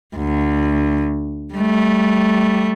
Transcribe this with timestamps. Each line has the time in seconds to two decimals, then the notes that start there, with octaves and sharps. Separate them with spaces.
0.16 D2
1.53 G3 A3